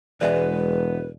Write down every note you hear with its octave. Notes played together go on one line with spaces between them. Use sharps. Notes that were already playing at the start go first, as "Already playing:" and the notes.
E1 E3 G#3 B3 B4 D5 E5 G#5